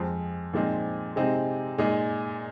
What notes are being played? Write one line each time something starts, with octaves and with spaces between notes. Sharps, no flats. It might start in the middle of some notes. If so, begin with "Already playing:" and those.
Already playing: F2 F3 G#3 C4
A#2 F3 G#3 C4 D#4
C3 G#3 C4 D#4
A#2 G#3 D#4